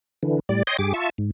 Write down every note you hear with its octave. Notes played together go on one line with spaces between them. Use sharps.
D3 E3
A2 G3 D5
C#5 D#5 G5 C6 D#6
G2 G4 G#4 D6
F4 E5 A5 C#6
G#2